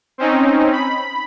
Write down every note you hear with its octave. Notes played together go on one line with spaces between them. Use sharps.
C4 C#4 D#4
B5